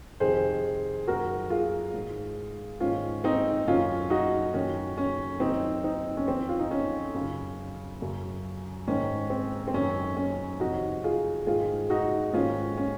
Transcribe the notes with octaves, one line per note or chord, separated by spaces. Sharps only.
F2 C3 D#3 G#4 C5
F#2 D#3 F#4 A#4
F4 G#4
G#2 D#3
G#2 D#3 C#4 F4
C4 D#4
F#2 D#3 C#4 F4
D#4 F#4
F#2 D#3 C#4
C#4
F#2 D#3 C4 D#4
C4 D#4
C#4
F2 D#3 C4
F4
D#4
C#4
F#2 C#3
F#2 C#3
G#2 D#3 C#4
C4
C4
F#2 D#3 C#4
C#4
F2 C3 D#3 D#4 F#4
F4 G#4
G#2 D#3 F4 G#4
D#4 F#4
G#2 D#3 C#4 F4
C#4